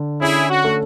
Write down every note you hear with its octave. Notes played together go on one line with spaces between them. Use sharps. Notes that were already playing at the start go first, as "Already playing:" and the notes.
Already playing: D3
C#4 E4 G#4
F#4
A3